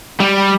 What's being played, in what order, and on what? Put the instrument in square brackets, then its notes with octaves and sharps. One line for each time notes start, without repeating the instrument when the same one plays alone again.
[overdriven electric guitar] G3